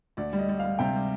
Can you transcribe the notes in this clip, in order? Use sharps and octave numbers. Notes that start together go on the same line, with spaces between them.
D2 D5
G3
D#5
G3
G3 F5
C3 G5
G3